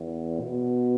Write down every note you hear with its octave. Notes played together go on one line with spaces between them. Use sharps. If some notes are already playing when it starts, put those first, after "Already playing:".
Already playing: E2
B2